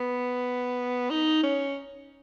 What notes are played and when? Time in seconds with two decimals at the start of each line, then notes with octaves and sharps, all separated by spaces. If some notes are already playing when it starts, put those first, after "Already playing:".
Already playing: B3
1.10 D#4
1.43 C#4